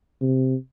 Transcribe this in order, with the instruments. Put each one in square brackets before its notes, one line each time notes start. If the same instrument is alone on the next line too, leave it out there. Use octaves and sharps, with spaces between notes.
[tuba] C3